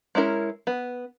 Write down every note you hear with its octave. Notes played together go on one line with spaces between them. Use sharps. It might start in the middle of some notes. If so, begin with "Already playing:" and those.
G#3 C#4 E4 A#4
B3